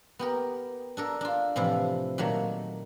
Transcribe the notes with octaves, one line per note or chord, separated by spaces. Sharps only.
B3 G4 A#4
D4 A4 A#4
D4 F4
A2 C3 E3 F3 E4
A#2 D#3 F#3 A3